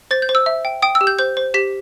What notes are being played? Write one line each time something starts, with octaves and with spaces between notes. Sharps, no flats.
C5 A6
G6
C5
E6
E5
G5
G5 D#6
E6
G4
G6
C5 G6
C5
G4 B6